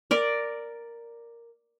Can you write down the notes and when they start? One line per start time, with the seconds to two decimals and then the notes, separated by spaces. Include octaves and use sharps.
0.11 A#4 D5